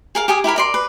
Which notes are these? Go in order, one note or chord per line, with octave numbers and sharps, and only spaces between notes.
G#4 A#4 F5
G4 G#4 G#5 D#6
E4 G4 A#4 B5
A#4 D5 C6
B4